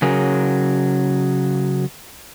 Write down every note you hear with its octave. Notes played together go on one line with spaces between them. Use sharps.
C#3 F#3 G#4 A#4